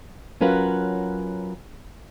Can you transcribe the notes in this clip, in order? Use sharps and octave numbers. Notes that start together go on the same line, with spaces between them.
F#3 C#4 F4 A#4 B4 F#5